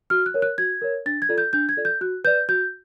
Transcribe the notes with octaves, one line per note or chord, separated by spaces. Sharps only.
F#4 F6
F#6
A#4 C#5
F#6
F#4 G#6
A#4 C#5
D4 A6
G#6
F4 A4 D5
G6
D4 G6
G#6
F4 A4 D5
G6
F#4 F#6
B4 D5 G6
F#4 G6